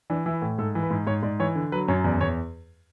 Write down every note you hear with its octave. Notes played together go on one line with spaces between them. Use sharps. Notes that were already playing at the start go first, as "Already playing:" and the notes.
E3 D4
E3 E4
A2
G#2 A4
E3
B4
G#2
G#2 C#5
G#2 D5
E3 C#5
D3
F#3 B4
F#2 C#5
E2 D5
E2 C#5